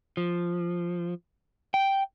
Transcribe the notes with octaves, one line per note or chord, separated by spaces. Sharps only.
F3
G5